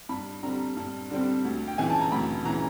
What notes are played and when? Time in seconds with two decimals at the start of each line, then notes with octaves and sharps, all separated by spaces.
0.09 G2 B5
0.43 D3 G3 C4 A#5
0.77 G2
1.10 D3 G3 C4
1.44 D2
1.68 G5
1.78 C#3 E3 G#5
1.90 A5
2.01 A#5
2.12 D2 B5
2.45 C#3 E3 A#5